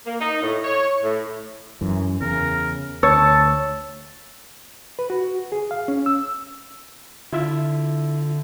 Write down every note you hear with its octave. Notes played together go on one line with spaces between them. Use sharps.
A#3
D#4
A2
C#5
A2
F#2 E3
E2 C#3 A#4
D2 C#5 A5 E6
B4
F#4
G#4
F5
C#4
E6
D3 E4 F4 E5